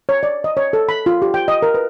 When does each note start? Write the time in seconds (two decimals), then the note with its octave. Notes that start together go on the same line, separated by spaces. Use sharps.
0.09 C#5
0.23 D5
0.44 D#5
0.57 C#5
0.73 A4
0.89 B5
1.06 F4
1.22 G4
1.34 G5
1.48 D#5
1.62 A#4
1.75 B4